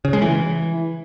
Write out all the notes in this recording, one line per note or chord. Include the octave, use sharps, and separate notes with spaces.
C#3
G#3
E3